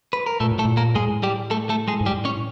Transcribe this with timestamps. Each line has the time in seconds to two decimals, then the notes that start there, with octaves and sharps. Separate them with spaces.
0.13 B4
0.26 A#4
0.40 A#2 A3 A4
0.52 A2
0.59 A3 A4
0.65 A#2
0.77 A#3 A#4
0.95 A2 G#3 G#4
1.23 G3 G4
1.51 A3 A4
1.69 A3 A4
1.88 G#3 G#4
2.01 G#2
2.06 A2 G3 G4
2.25 C#4 C#5